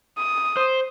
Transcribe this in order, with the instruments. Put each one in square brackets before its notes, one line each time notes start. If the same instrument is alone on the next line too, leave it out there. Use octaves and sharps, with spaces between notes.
[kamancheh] D#6
[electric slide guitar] C5